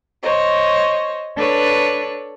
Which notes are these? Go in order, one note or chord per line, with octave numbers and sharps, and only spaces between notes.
C5 C#5 D#5
D4 A4 B4 C#5